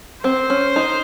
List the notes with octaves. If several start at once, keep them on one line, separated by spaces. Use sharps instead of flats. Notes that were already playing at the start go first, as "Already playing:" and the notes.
C4 C5
C#4
D#4